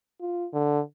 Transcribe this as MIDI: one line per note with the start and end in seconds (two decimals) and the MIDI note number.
0.20 0.47 65
0.53 0.80 50